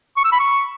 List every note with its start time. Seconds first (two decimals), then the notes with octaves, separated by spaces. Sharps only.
0.17 C#6
0.25 E6
0.32 B5
0.40 C#6